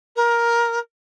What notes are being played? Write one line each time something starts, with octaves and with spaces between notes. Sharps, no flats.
A#4